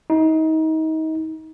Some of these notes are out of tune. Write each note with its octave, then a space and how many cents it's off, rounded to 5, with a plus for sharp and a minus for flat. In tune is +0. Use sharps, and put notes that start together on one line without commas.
D#4 +30